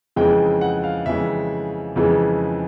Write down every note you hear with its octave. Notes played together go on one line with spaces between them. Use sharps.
F2 C#3 E3 G#3 G5
F#5
F5
F2 C#3 E3 G#3 E5
F2 C#3 E3 G#3